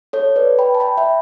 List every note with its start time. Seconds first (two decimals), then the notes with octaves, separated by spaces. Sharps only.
0.13 A4 C#5
0.36 B4 D5
0.59 G5 B5
0.75 A5
0.80 G5 B5
0.97 E5 G5